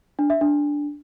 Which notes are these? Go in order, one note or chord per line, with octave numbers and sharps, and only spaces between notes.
D4
E5
D4